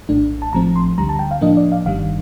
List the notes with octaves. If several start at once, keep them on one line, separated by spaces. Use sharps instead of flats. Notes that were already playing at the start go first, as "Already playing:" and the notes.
A#1 A2 A3 D4
A5
A1 A2 F3 A3 C4 A#5
C6
D2 D3 G3 A#5
A5
G5
F5
A2 F3 A#3 D4 D#5
D5
F5
G1 G2 D#3 G3 F5